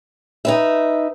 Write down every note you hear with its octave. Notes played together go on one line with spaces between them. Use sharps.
D#4 B4 E5